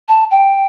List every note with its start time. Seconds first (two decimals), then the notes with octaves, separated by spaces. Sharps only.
0.08 A5
0.31 G5